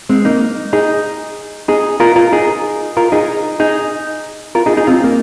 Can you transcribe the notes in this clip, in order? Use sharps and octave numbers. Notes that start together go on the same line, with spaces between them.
G#3 C4
A#3 D#4
D#4 G#4
D#4 G#4
F4 A#4
F4 A#4
D#4 G#4
F4 A#4
D#4 G#4
D#4 G#4
F4 A#4
D#4 G#4
D#4 G#4
C4 F4
A#3